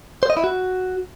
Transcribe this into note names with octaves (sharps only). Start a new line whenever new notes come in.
C5
D#5
E4
F#4